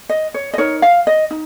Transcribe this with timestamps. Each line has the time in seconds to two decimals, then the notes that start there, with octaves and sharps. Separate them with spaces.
0.09 D#5
0.34 C#5
0.54 D#5
0.58 D#4 A#4 C#5
0.82 F5
1.07 D#5
1.31 D#4